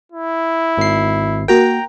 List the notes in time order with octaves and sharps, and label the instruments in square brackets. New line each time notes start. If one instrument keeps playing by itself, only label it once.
[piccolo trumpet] E4
[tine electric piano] G#1 C7
[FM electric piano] A#3 F#4 A#4 [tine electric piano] G5 A#5